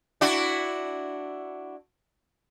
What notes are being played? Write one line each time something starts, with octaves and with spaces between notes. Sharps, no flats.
D4 E4 F#4